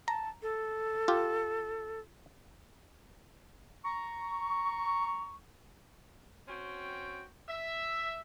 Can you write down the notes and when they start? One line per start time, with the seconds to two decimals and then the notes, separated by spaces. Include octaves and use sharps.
0.08 A5 A#5
0.43 A4
1.08 F4 G4
3.84 A#5 C#6
6.48 C4 C#4 F#4 G5
7.49 E5